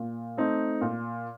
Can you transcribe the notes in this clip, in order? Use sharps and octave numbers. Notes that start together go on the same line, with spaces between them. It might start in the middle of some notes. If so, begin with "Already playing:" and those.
Already playing: A#2
A3 C4 D#4
A#2